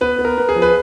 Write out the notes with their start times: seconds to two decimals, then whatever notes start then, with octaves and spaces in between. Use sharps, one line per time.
0.01 B3 B4
0.19 B3
0.25 A#4
0.37 B3
0.49 G#4
0.56 F3
0.62 B4